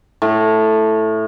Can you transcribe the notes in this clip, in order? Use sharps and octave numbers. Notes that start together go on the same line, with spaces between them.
A2